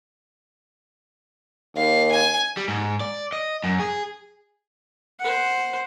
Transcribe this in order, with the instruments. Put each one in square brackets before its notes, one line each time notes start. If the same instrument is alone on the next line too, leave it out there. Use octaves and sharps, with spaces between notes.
[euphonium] D#2 [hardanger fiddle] F5
[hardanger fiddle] G#5
[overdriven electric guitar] G3
G#2
D5
D#5
F#2
G#4
[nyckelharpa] C5 F#5